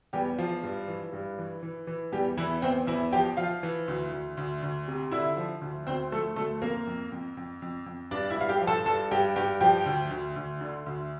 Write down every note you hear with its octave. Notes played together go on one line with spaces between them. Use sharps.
E2 G3 G4
E2 F3 F4
G2
E3
G2
E3
E3
E3
E2 G3 G4
E2 E3 E4
E2 C4 C5
E2 E4 E5
F3 G4 G5
F3 F4 F5
E3
D2
D2
D2
D2
C3
D3 E4 E5
F3
D2
D2 C4 C5
F3 A3 A4
D2 A3 A4
F2 A#3 A#4
F2
F2
F2
F2
F2
G2 D4 D5
E4 E5
G2 F5
G4 G5
F3
A4 A5
G2 A4 A5
G2 G4 G5
G2 G4 G5
F3 G4 G5
D2
D2
D2
D3
D2